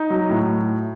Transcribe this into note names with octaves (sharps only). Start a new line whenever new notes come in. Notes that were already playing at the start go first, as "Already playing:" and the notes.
Already playing: D#4
F#3
A2